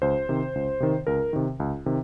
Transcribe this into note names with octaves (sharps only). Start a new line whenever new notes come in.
C#2 C5
C3 D#3
C#2
C3 D#3
C#2 A#4
C3 D#3
C#2
C3 D#3